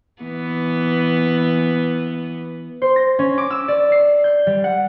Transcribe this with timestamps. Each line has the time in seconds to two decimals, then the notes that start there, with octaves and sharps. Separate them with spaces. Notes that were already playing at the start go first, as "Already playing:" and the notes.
0.22 E3 B3
2.82 C5
2.96 A#6
3.19 C#4
3.38 D6
3.51 E6
3.68 D5
3.92 C7
4.24 G6
4.47 G3
4.64 F#5